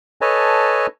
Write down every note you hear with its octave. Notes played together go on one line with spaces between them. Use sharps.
A4 B4 C#5 D#5 G#5 A5